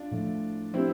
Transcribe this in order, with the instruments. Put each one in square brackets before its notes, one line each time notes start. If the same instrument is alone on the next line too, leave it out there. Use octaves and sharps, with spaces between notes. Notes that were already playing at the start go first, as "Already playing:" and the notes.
Already playing: [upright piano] D4 F4
[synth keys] A2 F3 A3
[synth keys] F3 B3 D4 G4 B4 [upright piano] C4 E4